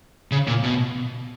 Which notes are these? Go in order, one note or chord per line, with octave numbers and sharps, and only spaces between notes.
C#3
A#2
B2